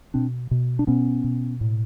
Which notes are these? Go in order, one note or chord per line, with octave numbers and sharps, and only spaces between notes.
B2 C4 D4
B2
D4
B2 B3 C#4
B2
A2